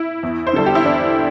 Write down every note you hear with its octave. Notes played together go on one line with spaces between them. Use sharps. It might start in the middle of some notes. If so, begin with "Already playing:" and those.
Already playing: E4
E2
C5
D3 G3 A4
G4
E4
E2 D4